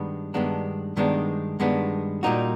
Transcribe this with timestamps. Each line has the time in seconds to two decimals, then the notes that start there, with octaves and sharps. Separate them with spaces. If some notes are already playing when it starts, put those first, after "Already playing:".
Already playing: G2 D#3 G#3 B3 D4
0.34 G2 D#3 G#3 B3 D4
0.97 G2 D#3 G#3 B3 D4
1.60 G2 D#3 G#3 B3 D4
2.23 A#2 G3 A#3 D#4 F#4